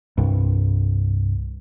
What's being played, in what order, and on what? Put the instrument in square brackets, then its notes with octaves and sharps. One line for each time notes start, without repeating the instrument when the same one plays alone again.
[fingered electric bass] C2 G2